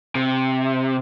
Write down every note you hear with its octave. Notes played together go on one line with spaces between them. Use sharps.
C3